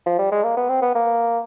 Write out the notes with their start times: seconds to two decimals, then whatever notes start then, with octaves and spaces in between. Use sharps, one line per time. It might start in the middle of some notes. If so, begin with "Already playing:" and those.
0.06 F3
0.19 G3
0.32 G#3
0.44 A#3
0.57 B3
0.69 C4
0.82 B3
0.95 A#3